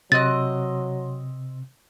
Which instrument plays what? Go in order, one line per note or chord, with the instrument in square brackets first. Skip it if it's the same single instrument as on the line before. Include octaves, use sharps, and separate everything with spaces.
[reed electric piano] C3 [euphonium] F#3 [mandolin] C4 D#5 F#6 [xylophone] A6